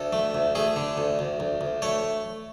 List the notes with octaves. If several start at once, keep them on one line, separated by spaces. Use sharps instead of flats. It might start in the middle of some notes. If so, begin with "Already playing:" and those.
Already playing: D2 A4
A3
D2
A3 G#4
D3
D2
D2
D2
D2
A3 C#5